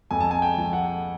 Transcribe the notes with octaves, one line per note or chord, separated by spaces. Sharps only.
F2 G#5
A5
G#5
G5
F3
F#5